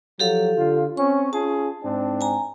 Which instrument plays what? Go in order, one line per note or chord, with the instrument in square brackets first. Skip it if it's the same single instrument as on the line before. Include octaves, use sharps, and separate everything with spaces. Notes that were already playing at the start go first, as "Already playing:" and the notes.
[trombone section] F3 F#3 [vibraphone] G4 A4 F5
[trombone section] D3 F4
[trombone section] C4 C#4 [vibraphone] C#6
[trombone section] C#4 F4 G#4 [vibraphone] A5
[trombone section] G#2 C4 D4
[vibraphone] G#5 A#5